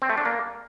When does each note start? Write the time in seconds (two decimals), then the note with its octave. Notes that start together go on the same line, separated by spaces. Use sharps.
0.02 C4
0.10 A3
0.17 D4
0.25 A#3